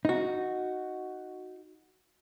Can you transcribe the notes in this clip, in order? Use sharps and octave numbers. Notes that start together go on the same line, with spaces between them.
D#4 F#4